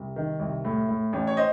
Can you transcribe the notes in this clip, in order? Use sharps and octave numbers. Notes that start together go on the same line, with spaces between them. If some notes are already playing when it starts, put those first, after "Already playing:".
Already playing: C2
D#3
C2
A2
A2
A1
C#5
C5 D#5